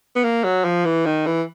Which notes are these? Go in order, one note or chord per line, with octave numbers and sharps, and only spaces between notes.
B3
A#3
F#3
F3
E3
D#3
E3